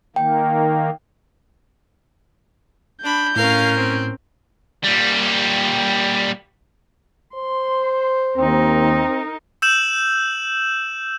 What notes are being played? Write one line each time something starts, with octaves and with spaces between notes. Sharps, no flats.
D#3 A#3 G5
D4 B5 G6
A2 C#4 A#4 F5 C7
C4
A#2 G3
C5 C6
D#2 C4 D#4 A#4
E6 G6 E7 F#7